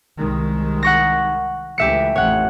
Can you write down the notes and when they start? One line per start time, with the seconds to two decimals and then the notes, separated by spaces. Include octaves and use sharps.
0.19 C2 D#3 G#3
0.83 F#5 C#6 A#6
1.78 C#2 E3 A3 G4 E5 C#7
2.16 A1 F2 C#5 F#5